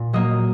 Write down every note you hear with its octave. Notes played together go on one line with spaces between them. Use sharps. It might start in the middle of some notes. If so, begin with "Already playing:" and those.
Already playing: A#2
F#3 A#3 D#5